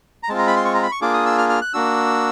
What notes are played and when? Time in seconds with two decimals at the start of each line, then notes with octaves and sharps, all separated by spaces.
0.23 A#5
0.29 G#3 C4 F4 A5
0.38 A#5
0.47 B5
0.56 C6
0.65 C#6
0.75 A#5
0.83 B5
0.92 C#6
1.01 A#3 D4 F4 G#4 D6
1.14 D#6
1.26 E6
1.38 F6
1.49 F6
1.62 F#6
1.73 A#3 D4 F#4 E6